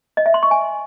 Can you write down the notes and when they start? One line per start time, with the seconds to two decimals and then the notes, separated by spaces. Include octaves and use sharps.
0.17 D#5
0.26 E5
0.34 C6
0.43 C#6
0.51 G#5